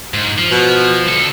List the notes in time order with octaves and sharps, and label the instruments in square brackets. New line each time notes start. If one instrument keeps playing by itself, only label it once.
[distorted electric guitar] G#2
F3
[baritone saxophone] B2
[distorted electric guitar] D2 A4